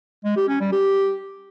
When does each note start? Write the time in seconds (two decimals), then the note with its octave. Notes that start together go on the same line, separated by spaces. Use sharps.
0.25 G#3
0.37 G4
0.49 C#4
0.61 G3
0.73 G4